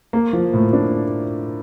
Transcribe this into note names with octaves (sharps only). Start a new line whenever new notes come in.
A#3
F3
A2
D4